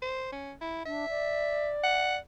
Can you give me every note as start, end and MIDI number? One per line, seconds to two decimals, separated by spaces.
0.02 0.31 72
0.32 0.52 61
0.61 0.84 64
0.85 1.09 62
0.85 1.70 76
1.09 2.18 74
1.83 2.16 78